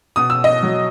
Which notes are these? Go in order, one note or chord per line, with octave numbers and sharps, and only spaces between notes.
B2 D#6
E6
D#5 D#6
F#3